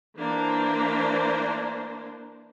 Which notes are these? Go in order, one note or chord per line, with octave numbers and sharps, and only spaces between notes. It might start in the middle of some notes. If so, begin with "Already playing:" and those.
E3 A#3 D4 C5